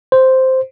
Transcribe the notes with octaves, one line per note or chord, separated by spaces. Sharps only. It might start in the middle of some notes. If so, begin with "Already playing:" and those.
C5